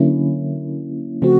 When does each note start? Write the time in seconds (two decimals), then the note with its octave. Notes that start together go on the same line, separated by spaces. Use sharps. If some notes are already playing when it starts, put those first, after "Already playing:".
Already playing: D3 F#3 A#3 C#4 E4
1.22 C#3 F3 A3 C4 F#4